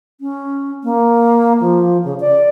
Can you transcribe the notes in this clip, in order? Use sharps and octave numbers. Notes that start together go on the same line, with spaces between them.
C#4
A#3
F3
C#3
D5